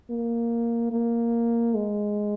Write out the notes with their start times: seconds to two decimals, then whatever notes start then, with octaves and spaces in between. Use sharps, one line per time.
0.10 A#3
0.92 A#3
1.75 G#3